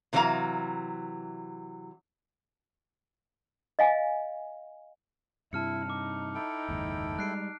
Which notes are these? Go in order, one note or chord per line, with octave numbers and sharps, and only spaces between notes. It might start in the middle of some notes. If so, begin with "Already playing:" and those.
C3 E3 F#3 C4 F5 A#5
D#5 F5 G#5
G2 C3 E4 A5 F6 C#7
D#4 D6
E4 A4 G5
F#1 D#2 G#2
G3 G#3 F#6 C7 D7